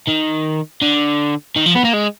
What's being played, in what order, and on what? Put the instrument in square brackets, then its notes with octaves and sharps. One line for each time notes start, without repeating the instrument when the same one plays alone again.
[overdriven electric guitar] D#3
D3
D#3
F3
B3
A#3
G#3